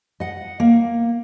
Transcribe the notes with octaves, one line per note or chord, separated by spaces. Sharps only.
D#5 F#5
A#3